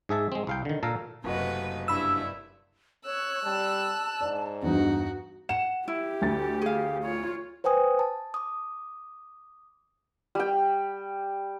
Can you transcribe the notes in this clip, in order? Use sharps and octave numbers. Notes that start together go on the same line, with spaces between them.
G#2 G#4 E5 A5
G#3 C4
C2 F5 G5
D3 D#3
A#2 A4 F5 A#5
F#1 C3 A3 F#4 B4 D#5
G2 E4 B5 E6
C#5 E6 F#6
G3 A5
G#2 D5
E2 G2 D#4 F#4
F#5 E7
E4 G4
D2 A6
G#4 F5
F4 C#5
B4 C5 G5 G#5 D#6
A5
D6 D#6
G3 G5